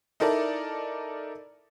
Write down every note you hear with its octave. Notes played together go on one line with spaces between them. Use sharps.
D#4 E4 A4 A#4 D5